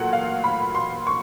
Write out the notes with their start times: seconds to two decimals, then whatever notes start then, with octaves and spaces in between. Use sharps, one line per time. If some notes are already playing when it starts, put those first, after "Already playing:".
Already playing: A#2 F#3 A3 F#5
0.13 F5
0.44 B5
0.75 C6
1.07 C#6